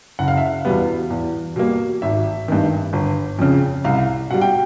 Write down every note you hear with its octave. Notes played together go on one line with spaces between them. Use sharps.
F#1 F#5
F5
E5
F5
E2 B2 G3 B3
E2
B2 G3 A#3
G#1 E5
G2 D#3
G1
F2 C#3
C2 F5
B2 G3 F#5
G5